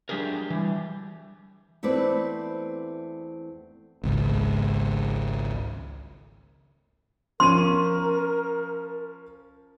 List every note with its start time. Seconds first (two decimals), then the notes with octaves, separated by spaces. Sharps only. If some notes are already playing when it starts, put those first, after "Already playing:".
0.09 F#3 D4 G4 G#4 A#4
0.50 E3 G3
1.83 E2 A3 C4 E4 B4 D5
4.04 G#1 C#2
7.40 F3 C#4 A#4 C6 D#7